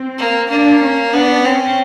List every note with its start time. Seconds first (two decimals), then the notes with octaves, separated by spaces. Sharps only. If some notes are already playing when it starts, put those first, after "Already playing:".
Already playing: C4
0.18 A#3
0.50 A#3 D4
0.82 C#4
1.13 B3 D4
1.44 C4 C#4